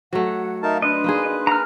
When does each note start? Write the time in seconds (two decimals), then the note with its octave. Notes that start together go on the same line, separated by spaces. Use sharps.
0.13 F#3 A3 F#5
0.63 D#4 A#4 E5 F5 A5
0.82 D4 B4 D#5 C6
1.04 A#3 D#4 G#4
1.47 A#5 F6